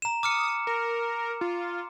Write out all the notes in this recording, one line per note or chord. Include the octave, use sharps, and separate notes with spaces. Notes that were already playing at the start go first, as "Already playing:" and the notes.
A#5 E7
D6 D#6 F6 C#7
A#4
F4